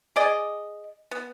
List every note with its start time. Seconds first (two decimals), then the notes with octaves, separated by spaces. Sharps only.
0.16 G#4 D5 D#5
1.11 B3